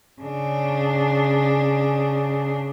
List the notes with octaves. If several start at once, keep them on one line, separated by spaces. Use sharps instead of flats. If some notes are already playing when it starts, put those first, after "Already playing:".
C#3 D4